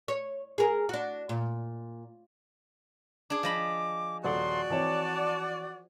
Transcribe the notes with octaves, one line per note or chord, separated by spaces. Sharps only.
C#5
G#4 A#4
D4 F#4
A#2
D4 G#4 D6
F3 D#5 B5
D#1 F#4 A4 D5 F#5 C6
E3 C4 C#5 A5